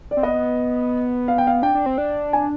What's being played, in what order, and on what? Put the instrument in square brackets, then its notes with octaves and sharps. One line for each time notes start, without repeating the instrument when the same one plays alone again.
[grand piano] D5
[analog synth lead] C4
[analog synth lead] B3 [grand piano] D#5
[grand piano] F5
G5
F5
[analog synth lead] D4 [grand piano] G5
[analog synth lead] D4
C4
D4
[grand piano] G#5